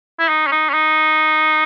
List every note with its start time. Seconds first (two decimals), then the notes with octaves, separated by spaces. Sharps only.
0.19 E4
0.29 D#4
0.47 C#4
0.52 D#4
0.70 C#4
0.74 D#4